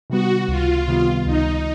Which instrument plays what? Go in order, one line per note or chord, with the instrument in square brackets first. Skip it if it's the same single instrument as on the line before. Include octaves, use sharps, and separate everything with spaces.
[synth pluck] C3 D#3 G3 B3 [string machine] F#4
[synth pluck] C#2 [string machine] F4
[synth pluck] C3 D#3 G3 B3
[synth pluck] C#2 [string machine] D#4